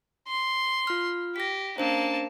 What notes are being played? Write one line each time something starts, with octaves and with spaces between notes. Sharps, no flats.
C6
F4 F6
G4 A#6 B6
A#3 C#4 D4 C5 A5